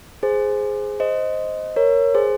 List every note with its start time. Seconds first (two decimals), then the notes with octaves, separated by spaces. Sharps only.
0.23 G#4 C5
1.00 C5 D#5
1.76 A#4 C#5
2.15 G#4 C5